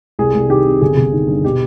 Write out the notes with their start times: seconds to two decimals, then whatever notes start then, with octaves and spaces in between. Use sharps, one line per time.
0.19 C2 G#4
0.35 C2
0.50 D#3 G4
0.65 C3
0.82 G1 G#4
0.97 G1
1.13 D#3
1.28 G2
1.44 B2 G4